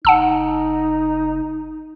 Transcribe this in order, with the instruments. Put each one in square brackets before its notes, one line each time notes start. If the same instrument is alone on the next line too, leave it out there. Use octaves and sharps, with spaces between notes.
[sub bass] F#1 [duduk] D#4 [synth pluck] F#5 A5 E6